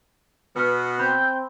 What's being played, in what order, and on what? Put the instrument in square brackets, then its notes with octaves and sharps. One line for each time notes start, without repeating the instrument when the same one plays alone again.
[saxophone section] B2 B3 [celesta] B4 F6
[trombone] C4 [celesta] B5 [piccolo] G6